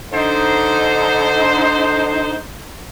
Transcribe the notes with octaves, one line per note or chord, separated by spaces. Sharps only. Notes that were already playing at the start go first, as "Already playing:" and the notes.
D3 D#4 C5